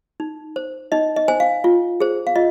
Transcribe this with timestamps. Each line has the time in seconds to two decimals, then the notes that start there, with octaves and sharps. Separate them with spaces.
0.20 D#4
0.56 C5
0.92 D#4 D#5
1.16 D#5
1.28 C5 G#5
1.40 F5
1.64 F4
2.00 G#4 C5
2.27 F5
2.36 F4 D#5